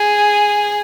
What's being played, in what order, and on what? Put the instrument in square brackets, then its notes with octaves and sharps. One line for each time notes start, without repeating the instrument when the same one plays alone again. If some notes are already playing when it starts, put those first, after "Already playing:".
Already playing: [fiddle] G#4